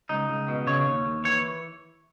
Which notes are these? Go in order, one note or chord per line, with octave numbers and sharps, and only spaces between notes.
C#2 D#4
C#2
B2
C#3 C#5
D#2
D#2
E3 C#5